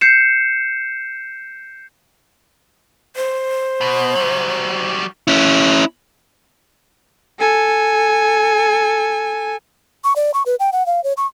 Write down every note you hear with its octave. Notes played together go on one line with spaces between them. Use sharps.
G6 C7 C#7 E7
C5
B2
F#3 G3
C#4 E4
A4 G#5
C#6
D5
C#6
B4
G5
F#5
F5
C#5
C#6